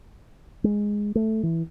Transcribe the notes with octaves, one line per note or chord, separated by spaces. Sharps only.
G#3
A3
E3